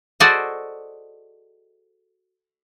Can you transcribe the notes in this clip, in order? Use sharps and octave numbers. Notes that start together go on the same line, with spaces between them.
F#4 G#4 A4 C5 D5 D#5